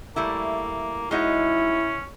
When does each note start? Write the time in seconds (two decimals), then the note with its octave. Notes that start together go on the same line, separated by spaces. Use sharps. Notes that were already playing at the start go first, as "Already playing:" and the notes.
0.16 G3 A3 A#3 E4
1.11 G#3 C#4 D#4 E4 F#4